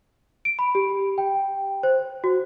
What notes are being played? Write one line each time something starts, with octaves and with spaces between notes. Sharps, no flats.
D7
B5
G4
G5
C5
F#4